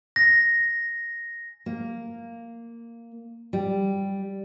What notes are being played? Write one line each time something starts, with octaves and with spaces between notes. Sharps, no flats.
A#6
A#3
G3